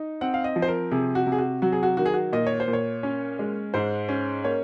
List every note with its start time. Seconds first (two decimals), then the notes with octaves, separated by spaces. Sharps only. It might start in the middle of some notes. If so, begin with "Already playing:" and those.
Already playing: D#4
0.21 C4 F#5
0.34 F5
0.44 D#5
0.56 F3
0.62 C5
0.68 A#4
0.91 C3 G#4
1.15 F#4
1.27 C3
1.32 G#4
1.38 F#4
1.62 F#3 F#4
1.72 G#4
1.83 F#4
1.97 D#3 F#4
2.05 G#4
2.14 F#4
2.33 A#2 D#5
2.47 C#5
2.60 C5
2.68 A#2
2.73 C#5
3.03 C#4
3.39 G#3
3.74 G#2 C5
4.09 C#4
4.44 A#3 C#5